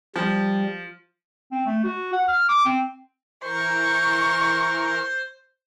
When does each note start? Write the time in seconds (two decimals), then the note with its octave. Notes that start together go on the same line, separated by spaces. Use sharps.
0.16 F3 G3
1.52 C4
1.66 A3
1.84 F#4
2.13 F#5
2.28 F6
2.49 D6
2.66 C4
3.43 E3 A#4 C5 C#6